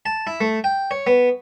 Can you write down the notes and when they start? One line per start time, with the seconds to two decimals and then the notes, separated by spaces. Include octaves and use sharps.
0.06 A5
0.27 E4
0.41 A3
0.64 G5
0.91 C#5
1.07 B3